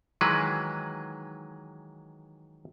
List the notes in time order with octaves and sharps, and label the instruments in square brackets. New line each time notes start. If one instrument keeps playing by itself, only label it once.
[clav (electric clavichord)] D#3 E3 F#3 G#3 B4